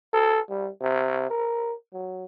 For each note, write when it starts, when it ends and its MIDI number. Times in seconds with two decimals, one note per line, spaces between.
0.13 0.40 69
0.49 0.69 55
0.81 1.26 48
1.30 1.73 70
1.93 2.24 54